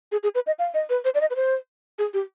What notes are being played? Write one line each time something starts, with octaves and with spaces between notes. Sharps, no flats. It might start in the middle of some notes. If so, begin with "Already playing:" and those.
G#4
G#4
B4
D#5
F5
D#5
B4
C5
D5
D#5
B4
C5
G#4
G4